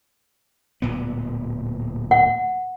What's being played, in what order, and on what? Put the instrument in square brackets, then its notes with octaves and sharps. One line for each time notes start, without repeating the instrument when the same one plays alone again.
[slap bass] D1 A#2 B3
[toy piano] F#5